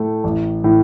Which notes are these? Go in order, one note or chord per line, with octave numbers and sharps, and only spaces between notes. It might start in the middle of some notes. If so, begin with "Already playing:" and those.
Already playing: A2 A3
A1
A2 E3